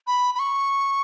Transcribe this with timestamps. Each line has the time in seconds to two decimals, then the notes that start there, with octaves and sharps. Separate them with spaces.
0.07 B5
0.35 B5
0.39 C#6